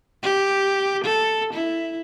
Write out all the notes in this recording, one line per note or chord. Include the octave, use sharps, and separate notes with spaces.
G4
A4
E4